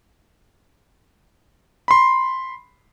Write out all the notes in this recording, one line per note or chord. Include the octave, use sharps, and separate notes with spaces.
B5 C6